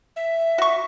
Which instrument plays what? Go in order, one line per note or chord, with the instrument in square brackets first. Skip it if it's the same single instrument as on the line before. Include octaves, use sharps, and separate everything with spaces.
[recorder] E5
[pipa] F#4 C#6